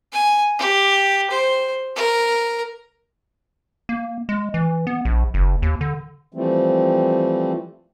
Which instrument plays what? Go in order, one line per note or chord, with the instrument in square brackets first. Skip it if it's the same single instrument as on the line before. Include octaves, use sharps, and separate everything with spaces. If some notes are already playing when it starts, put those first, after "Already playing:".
[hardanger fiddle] G#5
G4
C5
A#4
[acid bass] A#3
G#3
E3
B3
A#1
F#1
D#2
D3
[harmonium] E3 F3 G3 A3 C4